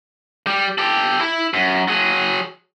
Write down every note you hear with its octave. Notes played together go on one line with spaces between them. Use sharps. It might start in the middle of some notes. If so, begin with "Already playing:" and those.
G3
G4 A4
E4
F#2
F#3 G#4